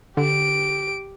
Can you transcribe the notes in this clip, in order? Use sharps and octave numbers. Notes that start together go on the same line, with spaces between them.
D3 G4 D7